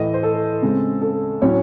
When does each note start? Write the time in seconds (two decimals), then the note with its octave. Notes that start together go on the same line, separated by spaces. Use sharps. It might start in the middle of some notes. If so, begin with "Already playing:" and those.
Already playing: A2 E3 A3 D#5
0.14 C5
0.23 A4
0.62 C#3 G#3 C4
1.02 A4
1.41 A2 F#3 C#4 C#5